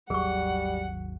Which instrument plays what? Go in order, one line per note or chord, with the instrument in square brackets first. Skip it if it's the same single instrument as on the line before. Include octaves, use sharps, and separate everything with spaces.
[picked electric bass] G#1 D#2 F#3 [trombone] G3 [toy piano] G#4 C#6 [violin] F#5